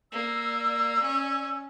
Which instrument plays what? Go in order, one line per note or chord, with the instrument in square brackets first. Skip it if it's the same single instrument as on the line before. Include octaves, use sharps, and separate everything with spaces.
[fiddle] A#3 [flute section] D5 E6
[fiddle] C#4